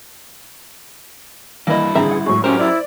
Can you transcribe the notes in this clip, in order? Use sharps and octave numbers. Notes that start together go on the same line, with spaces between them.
G2 E3 A#3 E4 D#5
A1 D3 C4 G#4 E5 A#5
F#5
A2 F#3 G#3 C#6
F#2 C#4 G4 A#4 C5
E4 D5